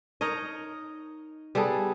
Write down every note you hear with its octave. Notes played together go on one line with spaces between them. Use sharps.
D#4 A#4 C#5 D#5
G3 B3 G#4 A4